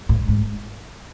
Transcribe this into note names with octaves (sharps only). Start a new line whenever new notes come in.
A2
G#2